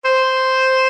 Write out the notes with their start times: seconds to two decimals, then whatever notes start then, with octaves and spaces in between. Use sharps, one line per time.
0.05 C5